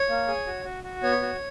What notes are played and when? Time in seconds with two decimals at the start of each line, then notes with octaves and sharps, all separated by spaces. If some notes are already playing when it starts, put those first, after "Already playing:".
Already playing: C#5
0.09 A#3
0.28 G#4
0.47 F#4
0.65 F#4
0.84 F#4
1.03 B3 C#5
1.22 F#4